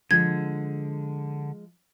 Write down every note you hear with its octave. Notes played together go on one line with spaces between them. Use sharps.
D3 F3 G#3 G#6